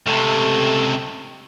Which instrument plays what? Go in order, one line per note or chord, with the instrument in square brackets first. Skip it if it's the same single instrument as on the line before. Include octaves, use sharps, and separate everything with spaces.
[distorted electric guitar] C#2 C3 [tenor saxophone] A3